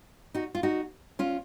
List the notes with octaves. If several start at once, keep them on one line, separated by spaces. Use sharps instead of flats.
D#4 F#4
F4
D#4 F#4
C#4 F4